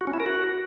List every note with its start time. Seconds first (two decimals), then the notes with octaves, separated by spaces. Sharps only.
0.01 F#4
0.07 C#4
0.13 E4
0.20 A#4
0.26 F#4